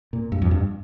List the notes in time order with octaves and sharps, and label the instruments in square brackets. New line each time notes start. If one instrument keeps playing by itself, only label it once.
[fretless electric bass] A#2
G2
F2
G2